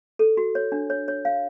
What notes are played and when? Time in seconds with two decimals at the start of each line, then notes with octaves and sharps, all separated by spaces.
0.19 A4
0.37 F#4
0.55 C#5
0.72 D4
0.90 C#5
1.08 C#5
1.25 F5